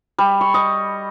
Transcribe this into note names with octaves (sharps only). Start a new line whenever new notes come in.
G3
C#6
D#5